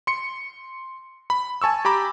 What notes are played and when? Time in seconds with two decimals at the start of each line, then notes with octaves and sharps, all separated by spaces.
0.07 C6 C#7
1.30 B5
1.62 G#5 A5 C#6 E6
1.85 G4 A#5 B5 D6